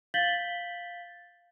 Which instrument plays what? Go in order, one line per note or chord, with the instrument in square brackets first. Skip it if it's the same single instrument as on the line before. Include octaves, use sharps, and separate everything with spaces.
[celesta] F5 G6 A6 B6 F#7 G7